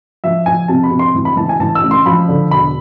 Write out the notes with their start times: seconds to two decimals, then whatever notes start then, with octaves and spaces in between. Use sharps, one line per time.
0.24 F3 E5
0.46 F3 G#5
0.68 C3 A5
0.84 B5
0.91 C3
0.99 C6
1.15 E3
1.25 B5
1.37 E3 A5
1.49 G#5
1.60 E3 A5
1.75 E6
1.83 A1
1.91 C6
2.06 F3 B5
2.28 D3
2.51 E1 B5